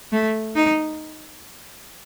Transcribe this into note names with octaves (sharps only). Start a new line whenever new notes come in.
A3
D#4